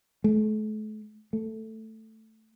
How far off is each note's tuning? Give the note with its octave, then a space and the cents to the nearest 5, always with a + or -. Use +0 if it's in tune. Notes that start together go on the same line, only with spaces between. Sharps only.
A3 -40
A3 +5